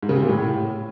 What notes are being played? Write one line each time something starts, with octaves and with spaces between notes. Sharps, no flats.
G#2
C#3
C3
A#2
A2